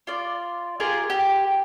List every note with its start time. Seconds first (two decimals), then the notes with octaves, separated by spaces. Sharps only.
0.07 F4 D5
0.80 F4 G4 G#4 A#4
1.10 G4